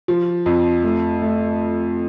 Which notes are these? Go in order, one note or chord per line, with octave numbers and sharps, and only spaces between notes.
F3
F2
A3
A3